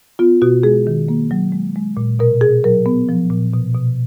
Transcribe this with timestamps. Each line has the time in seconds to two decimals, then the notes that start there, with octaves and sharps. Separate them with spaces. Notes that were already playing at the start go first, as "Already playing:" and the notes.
0.19 B3 F4
0.42 B2 F#4
0.63 G#3 G#4
0.87 D#3
1.08 A#3
1.31 F#3
1.52 G#3
1.76 G#3
1.97 A#2
2.19 B2 A#4
2.41 B2 G#4
2.64 F#3 A#4
2.86 B3
3.09 F3
3.31 A#2
3.53 B2
3.74 B2